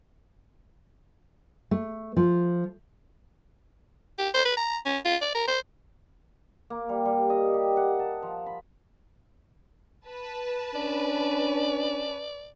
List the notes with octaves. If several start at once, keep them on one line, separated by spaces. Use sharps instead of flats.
A3
F3
G4
C5
B4
A#5
C#4
F4
D5
A#4
C5
A#3
G3
G3
D#5
G4
F#5
A5
F3
B5
B4 A5
C#4 D4 D5